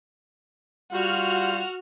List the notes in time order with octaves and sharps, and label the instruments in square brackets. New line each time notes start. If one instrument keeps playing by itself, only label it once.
[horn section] G3 F4 [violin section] F#4 F6